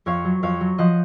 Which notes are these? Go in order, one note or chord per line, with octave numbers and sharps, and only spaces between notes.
F2 C#5 F5
F#3
F2 C#5 F5
F#3
F3 D#5 F#5